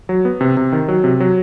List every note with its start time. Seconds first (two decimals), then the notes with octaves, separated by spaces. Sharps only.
0.09 F#3
0.25 B3
0.41 C3
0.57 C3
0.72 D#3
0.88 F#3
1.04 C3
1.20 F#3